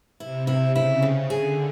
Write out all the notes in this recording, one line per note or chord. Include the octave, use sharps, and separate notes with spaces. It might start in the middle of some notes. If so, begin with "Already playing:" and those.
C3 E4
E4
C#3 E4
C4
D3 G#4